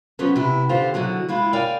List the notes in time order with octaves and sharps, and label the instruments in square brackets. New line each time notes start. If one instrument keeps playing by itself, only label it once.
[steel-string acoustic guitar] F3 F#3 B3 C#4
C3 B3 E4
D3 F4 G4 C5
D3 E3 F#3 G#4
G#3 E4 F4
A#4 C#5 D5 F5 G5 G#5